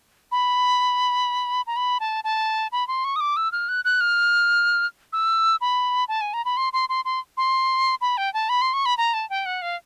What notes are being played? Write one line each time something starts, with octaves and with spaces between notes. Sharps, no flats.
B5
A#5
B5
A5
A5
B5
C6
C#6
D#6
D6
E6
F6
F#6
F#6
F6
E6
B5
A5
G#5
A#5
B5
C6
C6
C6
C6
C6
B5
G5
A5
B5
C6
C#6
B5
A#5
A5
G5
F#5
F5